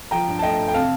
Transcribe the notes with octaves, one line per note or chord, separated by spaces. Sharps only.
F3 G5 A#5
G2
A5
A3 D#5 G5
G2
G5
C3 F5 A5